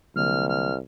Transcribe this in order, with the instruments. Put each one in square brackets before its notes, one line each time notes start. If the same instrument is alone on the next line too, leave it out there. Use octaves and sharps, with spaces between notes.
[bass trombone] C2 [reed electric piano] D3 F#3 A#3 [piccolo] F6
[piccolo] F6